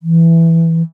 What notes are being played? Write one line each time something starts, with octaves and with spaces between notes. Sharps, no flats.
E3